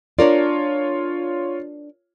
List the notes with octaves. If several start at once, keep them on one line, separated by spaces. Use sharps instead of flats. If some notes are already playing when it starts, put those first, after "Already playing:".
D4 F4 A#4 C#5 D5